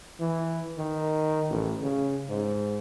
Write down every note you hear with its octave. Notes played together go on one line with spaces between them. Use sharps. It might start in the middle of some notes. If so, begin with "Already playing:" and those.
E3
D#3
A1
C#3
G#2